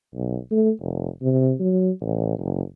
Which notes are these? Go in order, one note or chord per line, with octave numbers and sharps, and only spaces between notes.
B1
A3
F1
C3
F#3
A1
F#1